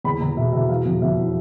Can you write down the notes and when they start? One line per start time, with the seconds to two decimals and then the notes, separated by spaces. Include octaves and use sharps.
0.04 E2 B5
0.20 E2 A#5
0.37 B2 E5
0.53 E2 E5
0.69 E3 F5
0.85 F2
1.02 F2 E5
1.18 E3